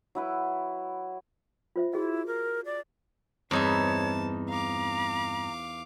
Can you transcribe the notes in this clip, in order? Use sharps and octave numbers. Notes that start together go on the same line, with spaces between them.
F#3 E4 B4
F4 C5 E5
E4 F#4 G#4 D#5
A#4
D5
E2 G2 C4 D#4 C5 C#5 E5 A5
F5 A#5 D6